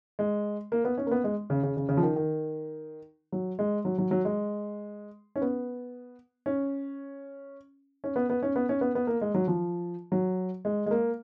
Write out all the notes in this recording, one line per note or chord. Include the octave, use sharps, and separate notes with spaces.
G#3
A#3
B3
C#4
A#3
B3
G#3
C#3
C#3
C#3
C#3
F3
D#3
D#3
F#3
G#3
F#3
F#3
F#3
G#3
C#4
B3
C#4
C#4
B3
B3
C#4
B3
C#4
B3
B3
A#3
G#3
F#3
F3
F#3
G#3
G#3
A#3